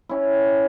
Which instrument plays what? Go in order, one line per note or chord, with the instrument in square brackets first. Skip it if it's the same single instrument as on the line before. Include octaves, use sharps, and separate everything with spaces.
[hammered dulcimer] C#4 E4